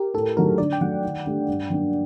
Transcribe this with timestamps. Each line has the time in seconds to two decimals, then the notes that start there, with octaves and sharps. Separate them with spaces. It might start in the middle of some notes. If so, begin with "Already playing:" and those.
Already playing: G4 A#4
0.14 A2 A4
0.36 F#3 A3 D#4 F#4 A#4
0.58 D3 D5
0.73 G5
0.81 F#3 A3 F#5
1.03 D#3
1.26 A3 D4 G4
1.48 G2
1.70 F#3 A#3 D4